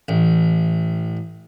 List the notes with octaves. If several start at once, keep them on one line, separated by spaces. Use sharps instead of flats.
A1